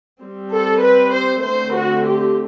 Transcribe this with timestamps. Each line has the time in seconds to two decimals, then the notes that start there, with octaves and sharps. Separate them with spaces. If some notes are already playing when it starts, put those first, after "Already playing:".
0.24 G3 C4
0.54 A4
0.84 B4
1.14 C5
1.44 D3 A3 C4 C5
1.75 F#4
2.06 G4